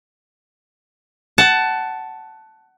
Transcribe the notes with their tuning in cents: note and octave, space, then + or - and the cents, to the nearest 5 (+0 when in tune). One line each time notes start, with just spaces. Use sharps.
F#5 +20 A5 +0